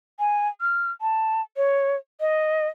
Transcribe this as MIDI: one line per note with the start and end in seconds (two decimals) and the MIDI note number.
0.19 0.48 80
0.61 0.91 89
1.01 1.41 81
1.57 1.96 73
2.20 2.68 75